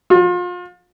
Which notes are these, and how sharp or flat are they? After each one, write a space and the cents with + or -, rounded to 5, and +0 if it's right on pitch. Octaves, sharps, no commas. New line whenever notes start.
F4 +35